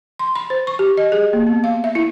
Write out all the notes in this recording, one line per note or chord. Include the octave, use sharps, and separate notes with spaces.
C6
B5
C5
C#6
G4
D#5
G#4
A#3
B3
F5
E5
E4